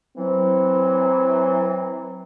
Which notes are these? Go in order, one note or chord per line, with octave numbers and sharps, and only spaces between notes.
E3 F#3 C4